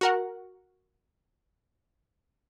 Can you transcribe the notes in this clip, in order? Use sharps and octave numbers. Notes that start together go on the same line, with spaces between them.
F#4 A#4 F#5